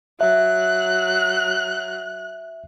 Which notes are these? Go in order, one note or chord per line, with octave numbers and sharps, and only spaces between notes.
F#3 E5 F#6